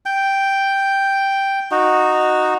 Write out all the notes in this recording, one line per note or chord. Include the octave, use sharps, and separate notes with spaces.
G5
D#4 F#4